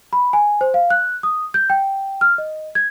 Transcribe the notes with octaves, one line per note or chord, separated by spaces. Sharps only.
B5
G#5
C5
F5
F#6
D#6
G6
G5
F6
D#5
G#6